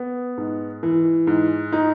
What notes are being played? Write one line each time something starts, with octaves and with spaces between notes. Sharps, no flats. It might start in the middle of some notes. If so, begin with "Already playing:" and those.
Already playing: B3
G#2
E3
G#2
D#4